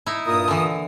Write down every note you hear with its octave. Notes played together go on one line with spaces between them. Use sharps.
D#4 E4
G2 A#2 A#5 D#6
D3 E3